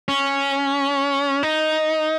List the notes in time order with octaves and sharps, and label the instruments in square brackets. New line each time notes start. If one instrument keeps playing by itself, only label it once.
[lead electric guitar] C#4
D#4